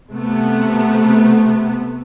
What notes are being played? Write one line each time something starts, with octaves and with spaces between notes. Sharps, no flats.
C3 A3 B3